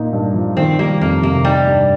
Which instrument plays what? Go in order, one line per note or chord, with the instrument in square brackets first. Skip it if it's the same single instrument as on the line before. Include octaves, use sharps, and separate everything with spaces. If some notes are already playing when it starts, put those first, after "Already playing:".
Already playing: [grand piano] A#2 A#3 D#4
G2
F3
[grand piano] D#3 [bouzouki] C4
[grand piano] G3 [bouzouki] A#3
[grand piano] F2 [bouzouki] A#3
[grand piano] C3 [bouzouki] A#3
[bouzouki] G3 [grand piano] D#4
[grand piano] G2